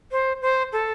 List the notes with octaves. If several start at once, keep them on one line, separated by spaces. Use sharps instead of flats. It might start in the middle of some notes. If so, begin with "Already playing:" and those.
C5
C5
A4